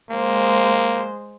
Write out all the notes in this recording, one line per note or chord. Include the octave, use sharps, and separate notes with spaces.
G#3 A#3 C5